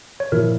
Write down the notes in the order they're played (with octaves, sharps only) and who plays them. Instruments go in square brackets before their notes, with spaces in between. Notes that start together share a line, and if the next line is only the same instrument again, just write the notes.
[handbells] C#5
[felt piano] A#2 F3 A#3 E4 [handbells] A#4